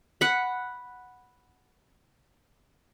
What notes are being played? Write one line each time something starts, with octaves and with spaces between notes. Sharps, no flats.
F#5 B5